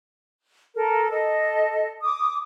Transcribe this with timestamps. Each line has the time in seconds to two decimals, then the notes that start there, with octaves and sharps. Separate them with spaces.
0.75 A4 A#4
1.10 A4 D#5
2.03 D6 D#6